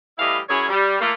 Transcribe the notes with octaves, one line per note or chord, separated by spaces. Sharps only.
A2 E3 G3 E4 D#5 F5
F#2 E4 G#4 C#5
G3
A3 A#3 F4